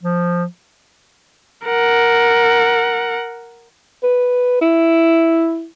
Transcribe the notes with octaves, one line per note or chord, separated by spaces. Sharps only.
F3
A#4 F#5
B4
E4